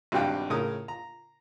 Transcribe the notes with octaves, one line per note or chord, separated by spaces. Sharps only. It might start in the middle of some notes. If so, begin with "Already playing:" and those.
G#1 G2 B2 G4 F5 G5
A2 C#3 A#4 D#6
A#5